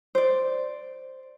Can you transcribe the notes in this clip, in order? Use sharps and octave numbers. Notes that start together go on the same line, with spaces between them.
C5 D5